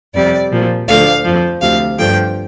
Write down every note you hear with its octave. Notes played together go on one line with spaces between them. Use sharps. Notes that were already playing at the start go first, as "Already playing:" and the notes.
F2 C3 G3 D5
A#2 F3
D2 D3 F3 F5
F2 F3
D2 C3 F3 F5
G2 D3 F3 G5